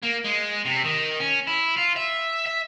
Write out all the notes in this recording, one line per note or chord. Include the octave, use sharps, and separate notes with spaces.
A#3
G#3
C3
D#3
C#4
E4
F4
E5
E5